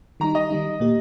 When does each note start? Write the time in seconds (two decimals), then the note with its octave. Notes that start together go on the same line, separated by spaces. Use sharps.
0.20 D#3 G3 D#4 A#5
0.35 D#5
0.50 D#3 G3 D#4
0.80 A#2 A#3 G4